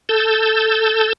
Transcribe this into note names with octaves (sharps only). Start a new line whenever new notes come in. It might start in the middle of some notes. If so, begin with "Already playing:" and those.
A4 A5 E6 G6